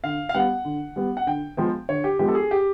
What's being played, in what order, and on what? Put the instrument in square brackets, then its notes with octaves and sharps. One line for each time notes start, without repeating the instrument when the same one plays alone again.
[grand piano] D3 F5
F5
G3 B3 F#5
D3
G3 B3
F#5
D3 G5
F3 G#3 B3 G5
D3 C#5
G4
F3 G#3 B3 G4
A4
G#4
G4